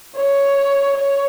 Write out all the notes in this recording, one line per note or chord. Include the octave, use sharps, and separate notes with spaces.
C#5
C#5